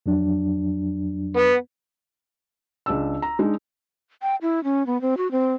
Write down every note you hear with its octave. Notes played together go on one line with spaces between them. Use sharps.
F2 F#3 D4
B3
C#2 D4 E6
A#5
G#3 D4 D#4
G5
E4
C#4
B3
C4
F#4
C4